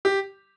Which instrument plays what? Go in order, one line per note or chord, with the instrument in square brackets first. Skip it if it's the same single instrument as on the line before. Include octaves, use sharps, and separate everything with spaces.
[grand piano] G4